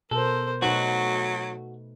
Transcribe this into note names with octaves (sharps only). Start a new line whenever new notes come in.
B2 A4 A#4 C5
B2 F#3 A3 D#4 F#4 B4